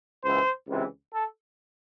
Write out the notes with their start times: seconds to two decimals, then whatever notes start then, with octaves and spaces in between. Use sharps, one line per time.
0.24 C#2 C#3 E3 C5
0.68 C#2 C3 E3
1.11 A4